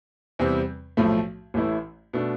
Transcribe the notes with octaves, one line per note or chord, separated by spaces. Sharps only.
E2 C3 E3 G3 C4
B1 A2 F3 A3
A1 A2 E3 A3 E4
B2 A3 D4